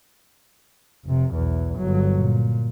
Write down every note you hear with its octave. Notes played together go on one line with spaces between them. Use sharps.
F1 C3
B1 E2
G1 F#3
A#2